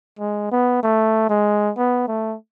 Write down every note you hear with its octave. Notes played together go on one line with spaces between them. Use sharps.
G#3
B3
A3
G#3
B3
A3